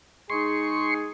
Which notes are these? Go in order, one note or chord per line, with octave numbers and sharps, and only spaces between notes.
G#3 D#4 G#4 C6 C#6